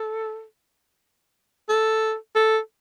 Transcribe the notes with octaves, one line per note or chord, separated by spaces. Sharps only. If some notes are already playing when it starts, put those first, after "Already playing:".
Already playing: A4
A4
A4